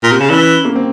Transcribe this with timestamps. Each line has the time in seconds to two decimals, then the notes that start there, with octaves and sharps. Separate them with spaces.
0.03 A#2
0.12 C3
0.21 C#3
0.30 E3 C#4
0.65 A#3
0.76 C4